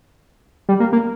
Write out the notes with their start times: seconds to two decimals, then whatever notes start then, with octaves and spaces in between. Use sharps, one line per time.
0.69 G3
0.80 A#3
0.93 A#3